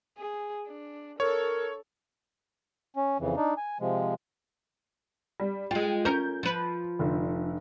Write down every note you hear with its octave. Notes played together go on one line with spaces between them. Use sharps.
G#4
D4
A4 A#4 C#5
C#4
F2 C#3 E3
D4 D#4
G#5
C3 F3 G#3
G3
G#3 F4 G5
C#4 A#4 G6
F3 B4
F1 D3